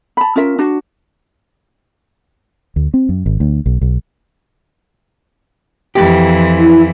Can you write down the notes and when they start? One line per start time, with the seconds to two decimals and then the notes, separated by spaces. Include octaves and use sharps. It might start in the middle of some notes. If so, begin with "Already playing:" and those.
0.17 A5 B5
0.36 C#4 F4 A#4 E5
0.59 D4 F#4
2.76 D2
2.94 C4
3.09 F#2
3.26 G#1
3.40 D2
3.66 B1
3.81 B1
5.95 F2 E3 G4
6.58 E4